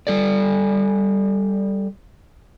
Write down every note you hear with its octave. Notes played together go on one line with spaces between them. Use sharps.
G3 A4 D5